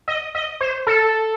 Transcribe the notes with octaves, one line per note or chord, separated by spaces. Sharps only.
D#5
D#5
C5
A4